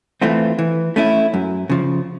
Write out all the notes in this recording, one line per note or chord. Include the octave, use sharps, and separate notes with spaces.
E3 A3 C4 F4
E3
A3 C#4 E4
F#2
C#3 F3